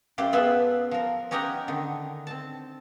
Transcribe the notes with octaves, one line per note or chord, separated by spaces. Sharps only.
F#2 F4 G4 C5 D5
B3 F4 G#4 A4 B4 E5
F3 A#4
C#4 D#4 G4 A#4 D#5 F#5
D3 D#3
C4 A5